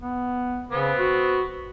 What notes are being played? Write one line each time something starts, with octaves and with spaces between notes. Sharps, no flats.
B3
C#3 B3 C4
F#4